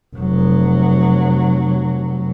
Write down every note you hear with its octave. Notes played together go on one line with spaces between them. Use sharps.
F1 F#3